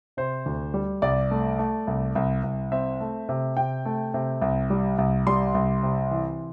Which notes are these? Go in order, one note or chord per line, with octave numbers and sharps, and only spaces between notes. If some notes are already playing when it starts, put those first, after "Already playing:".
C3 C5
D2
G3
C2 D5
A3
A3
C2
C2
C2
C4 E5
A3
C3
C3 G5
A3
C3
C2
G3
C2
G3 C6
C2
C3
E3